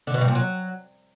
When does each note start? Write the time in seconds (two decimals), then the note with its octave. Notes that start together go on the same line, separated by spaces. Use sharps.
0.07 D3
0.14 B2
0.21 G2
0.28 A#2
0.35 F#3